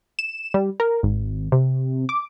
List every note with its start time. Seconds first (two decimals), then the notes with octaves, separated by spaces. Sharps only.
0.19 E7
0.54 G3
0.80 A#4
1.03 G#1
1.52 C3
2.09 D6